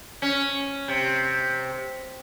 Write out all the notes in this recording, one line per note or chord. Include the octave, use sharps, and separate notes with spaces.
C#4
C3